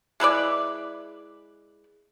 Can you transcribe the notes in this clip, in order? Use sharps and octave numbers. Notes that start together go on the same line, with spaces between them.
G#3 E4 B4 D5